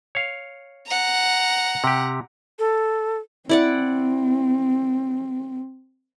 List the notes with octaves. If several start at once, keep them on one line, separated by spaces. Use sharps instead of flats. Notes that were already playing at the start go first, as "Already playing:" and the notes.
C#5 F5
F#5 A#5
C3 G4
A4
C4 E4 D5 F#5